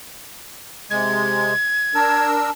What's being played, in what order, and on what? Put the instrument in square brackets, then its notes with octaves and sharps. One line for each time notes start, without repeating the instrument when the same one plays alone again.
[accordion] C3 G#3 [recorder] G#6
[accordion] D4 A#4 E6 [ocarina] A5